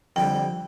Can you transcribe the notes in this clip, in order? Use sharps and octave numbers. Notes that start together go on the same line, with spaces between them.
F2 D3 G3 G5